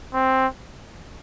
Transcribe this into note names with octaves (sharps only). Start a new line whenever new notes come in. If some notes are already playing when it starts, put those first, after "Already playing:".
C4